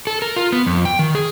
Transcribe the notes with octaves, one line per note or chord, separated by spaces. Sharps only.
A4
A#4
F4
B3
F2
G5
D#3
G#4